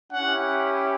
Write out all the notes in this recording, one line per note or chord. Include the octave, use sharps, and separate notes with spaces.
C#4 E4 G4 F#5